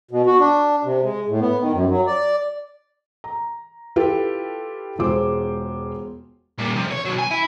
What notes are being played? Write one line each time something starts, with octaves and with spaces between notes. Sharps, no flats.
B2
F#4
D4
C3
G#3
A2
B3
D#3
F#2
F#3
D5
A#5
E4 F4 G4 A4 B4
E1 G#3 F4 C5 D6
A#2 G3
C3 F3
C#5
B2 F#3
G#5
E4